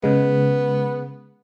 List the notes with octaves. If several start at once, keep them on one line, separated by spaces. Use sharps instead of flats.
C#3 G#3 B3